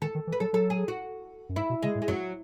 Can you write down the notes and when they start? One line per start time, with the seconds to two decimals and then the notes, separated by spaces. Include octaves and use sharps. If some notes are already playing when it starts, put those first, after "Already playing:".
0.02 D#3 A4
0.15 D#3
0.27 E3
0.32 B4
0.40 F#3 A4
0.53 F#3 A4
0.70 G#4
0.88 F#4
1.49 F#2
1.56 G#2 E4
1.70 B2
1.83 C#3 G#3
1.95 A2
2.02 G#3
2.08 F#2 F#3